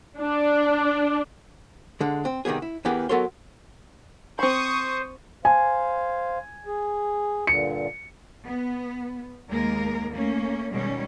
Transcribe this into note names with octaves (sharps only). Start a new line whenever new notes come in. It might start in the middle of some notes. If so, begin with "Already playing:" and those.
D4
D3 G#3
C4
C3 D#3 G3 B3 G#4
E4
E2 E3 B3 G4 G#4 A#4
F#3 B3 A4 A#4 C#5 C6
C4 C5 B5 C#6 D#6
C5 F5 G#5
G#4
G2 A#2 D3 C#7
B3
D#2 G#3 A#3 A#4
A3 A#3 C#4
B2 D#3 G3 G#3 C#4